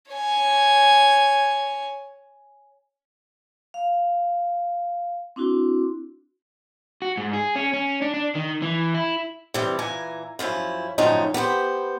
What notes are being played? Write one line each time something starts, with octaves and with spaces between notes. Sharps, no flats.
C#5 G#5
F5
C4 D4 E4 F#4
F#4
G#2
G#4
C#4
C#4
D4
D4
D#3
E3
E4
C3 E3 G3
A#2 E3 G#5 A#5
F#2 F3 C#4 E4
F#2 A2 D3 F3 C#4 D#4
B3 G4 A4 C5